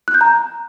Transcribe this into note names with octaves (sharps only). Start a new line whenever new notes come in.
F#6
G6
A#5